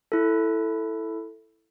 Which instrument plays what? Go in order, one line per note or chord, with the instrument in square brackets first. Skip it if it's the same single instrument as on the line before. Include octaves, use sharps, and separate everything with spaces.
[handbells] E4 A4